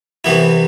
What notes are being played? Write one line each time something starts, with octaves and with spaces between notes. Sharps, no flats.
C2 C3 E3 B3 E4